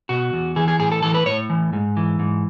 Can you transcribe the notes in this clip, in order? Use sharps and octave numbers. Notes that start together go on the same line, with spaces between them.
B2 F#4
E2
E3 G#4
G#4
A2 G#4
A4
E3 A4
B4
A2 C#5
E3
G#2
E3
G#2